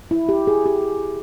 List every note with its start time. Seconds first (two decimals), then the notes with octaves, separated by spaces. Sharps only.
0.11 E4
0.29 G4
0.47 G#4
0.66 G4